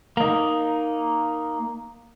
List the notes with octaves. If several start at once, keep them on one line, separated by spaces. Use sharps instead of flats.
A#3 D#4